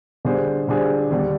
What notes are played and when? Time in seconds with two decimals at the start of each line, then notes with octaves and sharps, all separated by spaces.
0.25 D3 G3 D4 G#4 C5
0.68 D3 G3 D4 G#4 C5
1.11 D#2 D3 G3